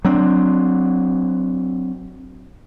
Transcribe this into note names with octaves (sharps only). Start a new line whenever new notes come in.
F#3 C4 D4